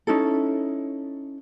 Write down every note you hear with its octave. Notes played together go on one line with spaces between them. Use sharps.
C#4 D#4 E4 A4